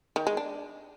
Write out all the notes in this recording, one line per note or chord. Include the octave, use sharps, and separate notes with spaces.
D#3
G#3
D4